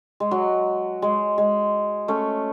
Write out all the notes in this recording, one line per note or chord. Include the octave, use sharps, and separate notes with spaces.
G#3
F#3
G#3
G#3
A3 C#4